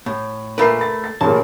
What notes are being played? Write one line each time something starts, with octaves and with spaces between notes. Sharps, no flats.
A2
A#2 A3 A#4 B4 B5 C7
B5 A6
A6
A1 A#2 C#3 A5